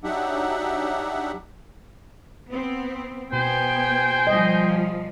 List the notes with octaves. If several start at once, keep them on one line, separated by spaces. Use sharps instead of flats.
F#3 D4 D#4 G4 E5 F#5
B3 C4
B2 B3 C5 G5 G#5
F3 G3 D#5